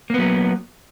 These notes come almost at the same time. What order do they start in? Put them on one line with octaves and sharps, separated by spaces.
A#3 B3 F#3